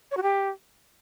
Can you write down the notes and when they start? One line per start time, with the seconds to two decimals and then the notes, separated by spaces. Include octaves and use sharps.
0.11 C#5
0.17 F#4
0.23 G4